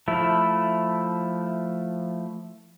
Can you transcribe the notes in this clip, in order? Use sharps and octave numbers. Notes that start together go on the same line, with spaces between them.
F3 A3 E4